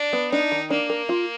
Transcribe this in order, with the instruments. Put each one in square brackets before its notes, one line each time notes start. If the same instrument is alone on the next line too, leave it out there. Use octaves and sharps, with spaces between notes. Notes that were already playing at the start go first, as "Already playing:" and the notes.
Already playing: [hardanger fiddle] D4
[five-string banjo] B3
[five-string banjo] D4 [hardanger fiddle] D#4
[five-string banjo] D#3
[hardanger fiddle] A#3 [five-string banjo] D4
[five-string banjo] A#4
F4